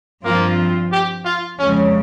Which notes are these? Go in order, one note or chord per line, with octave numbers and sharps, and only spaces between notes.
G2 F3 A#3 C4 F4
G4
F4
F2 C#3 G#3 C#4